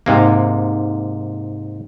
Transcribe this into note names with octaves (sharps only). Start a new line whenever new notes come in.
G#2 C3 A#3